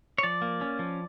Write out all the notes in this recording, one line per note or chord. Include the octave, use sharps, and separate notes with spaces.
C#5
F3 D5
A#3
C#4
F3